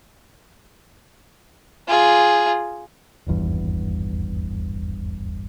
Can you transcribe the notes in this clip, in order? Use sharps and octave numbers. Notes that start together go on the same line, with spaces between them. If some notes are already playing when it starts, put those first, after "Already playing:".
F4 G#4
D#1 G#1 E2 G2